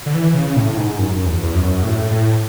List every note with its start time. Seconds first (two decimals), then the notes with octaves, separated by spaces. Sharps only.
0.06 D3
0.14 E3
0.34 C#3
0.57 A2
0.77 G#2
0.98 F#2
1.26 E2
1.43 E2
1.55 F#2
1.83 A2
2.11 A2